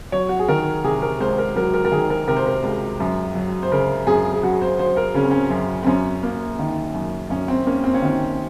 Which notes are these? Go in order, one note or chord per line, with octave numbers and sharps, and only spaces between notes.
F#3 C#5
F#4
G#4
D#3 A#4
C3 G#4
A#4
C#2 C5
A#4
F#3 A#4
A#4
A#4
D#3 G#4
A#4
C3 A#4
C5
A#4
C#2
F#2
F#3
C5
C#3 A#4
F#2 G#4
G#4
F#2 F#4
C5
F#3 C5
A#4
C#3 C#4
C4
C#4
F#2
C4
F#2 C#4
A#3
D#3
F#2
F#2 C#4
C4
A#3 C#4
C4
C#4
D#3 C4